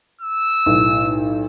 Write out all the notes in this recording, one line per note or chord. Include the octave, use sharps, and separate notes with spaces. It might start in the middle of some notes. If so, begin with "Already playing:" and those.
E6
B1 A2